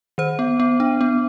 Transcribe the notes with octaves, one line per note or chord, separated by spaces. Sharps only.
D#3 C5
B3
B3
D4
B3